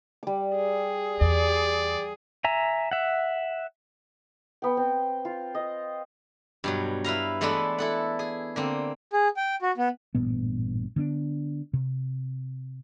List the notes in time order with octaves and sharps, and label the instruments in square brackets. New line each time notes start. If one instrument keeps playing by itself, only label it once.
[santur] G3 D6
[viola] G#4
[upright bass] E2 [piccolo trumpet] D5
[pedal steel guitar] E5 G#5 A#5
E5 F#5
[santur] B3 G5
C4
F4
D#5
[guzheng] G2 B2 F#3
E4 B4 F5 A#5
E3 G#3 A3 B3 D4 E4
E4 A4 F#5
G#4
D3 A#3 C4
[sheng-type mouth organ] G#4
G5
F#4
B3
[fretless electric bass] A1 G2 A#2 B3
D3 B3 C#4 D4
C3